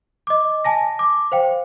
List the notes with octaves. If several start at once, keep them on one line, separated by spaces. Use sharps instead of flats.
D#5 D6
G#5 A5 A#6
D6
C5 F5 G5